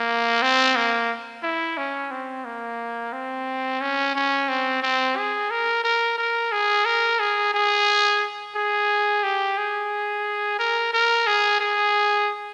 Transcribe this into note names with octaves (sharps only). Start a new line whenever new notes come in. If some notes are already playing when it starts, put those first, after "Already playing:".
Already playing: A#3
C4
A#3
E4
C#4
C4
A#3
C4
C#4
C#4
C4
C4
G#4
A#4
A#4
A#4
G#4
A#4
G#4
G#4
G#4
G4
G#4
A#4
A#4
G#4
G#4